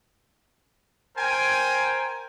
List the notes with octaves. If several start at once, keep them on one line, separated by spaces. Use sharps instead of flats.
A#4 C5 G5 G#5